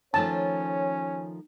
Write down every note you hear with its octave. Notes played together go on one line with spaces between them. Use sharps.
D#3 F3 A3 C#4 C#5 A5